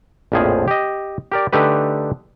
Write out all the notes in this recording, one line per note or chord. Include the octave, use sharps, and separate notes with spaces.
A#1 F2 A2 F3 G#4
G4 D#5
G4 A#4 D5
D3 A3 D#4 G4 B4